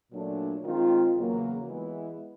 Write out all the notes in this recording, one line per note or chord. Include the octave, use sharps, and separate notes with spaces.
A#2 F#3 A3 D4
D#3 G#3 C4 F4
E2 C#3 F#3 A#3
E3 G#3 B3 E4